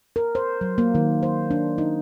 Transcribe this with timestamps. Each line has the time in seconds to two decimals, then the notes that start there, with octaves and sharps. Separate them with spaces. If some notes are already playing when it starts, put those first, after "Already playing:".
0.16 A#4
0.35 C5
0.61 F#3
0.78 A#3
0.95 D#3
1.23 C5
1.51 D4
1.78 D#4